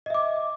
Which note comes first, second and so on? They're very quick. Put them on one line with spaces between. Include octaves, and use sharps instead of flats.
D#5 E5 D6